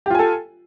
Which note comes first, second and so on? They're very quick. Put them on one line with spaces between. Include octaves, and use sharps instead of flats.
G4 F4 G#5 A4